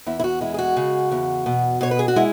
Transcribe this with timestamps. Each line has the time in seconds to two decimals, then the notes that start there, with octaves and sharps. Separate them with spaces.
0.06 E2 E4
0.20 E4
0.24 F#4
0.41 G#3 E4
0.54 G#4
0.58 F#4
0.77 C#3
1.11 E2
1.46 B2
1.81 B2 C#5
1.91 B4
1.99 G#4
2.08 F#4
2.16 G#3 E4